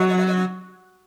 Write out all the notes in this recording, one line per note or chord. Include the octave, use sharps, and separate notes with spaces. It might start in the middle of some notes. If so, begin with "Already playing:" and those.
Already playing: F#3